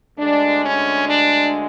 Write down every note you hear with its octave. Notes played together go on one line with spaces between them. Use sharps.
D2 D3 G#3 D4
C#4
D4